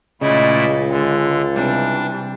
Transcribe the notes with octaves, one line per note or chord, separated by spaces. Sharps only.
C#2 A#2 C#3 A3 E4 D#5
D3 G#3
C3 E3 G3 D4